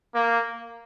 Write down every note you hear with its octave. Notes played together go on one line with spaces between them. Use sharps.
A#3